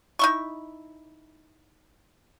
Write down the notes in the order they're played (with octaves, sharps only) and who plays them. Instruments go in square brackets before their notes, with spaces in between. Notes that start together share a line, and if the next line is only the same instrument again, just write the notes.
[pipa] D#4 E4 C#6